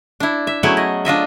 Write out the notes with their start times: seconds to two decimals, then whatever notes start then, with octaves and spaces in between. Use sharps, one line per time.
0.20 D4 E4
0.47 E5
0.63 F#3 A3 B3 C#4 E4 G#4
0.77 D#5
1.05 D4 F4 D#5 E5